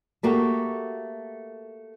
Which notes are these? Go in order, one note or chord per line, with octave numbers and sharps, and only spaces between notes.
A3 A#3 F#4 G4